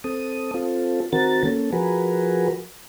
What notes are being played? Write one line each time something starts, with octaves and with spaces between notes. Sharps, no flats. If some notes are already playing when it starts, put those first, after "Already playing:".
C4 A4 D#6
C4 F4 A4
D#3 C4 F#4 A#4 A6
A#3 C#4 A4
F3 F#4 G#4 A#4 B4